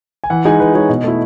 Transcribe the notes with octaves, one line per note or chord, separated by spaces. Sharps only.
G#5
E3 F#5
G#3 D#4 G#5
E3 B4
G#3 D#4 C#5
B2 D#5
A3 E4